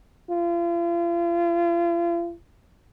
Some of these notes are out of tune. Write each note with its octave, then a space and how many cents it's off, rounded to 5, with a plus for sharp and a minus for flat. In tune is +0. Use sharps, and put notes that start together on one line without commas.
F4 -40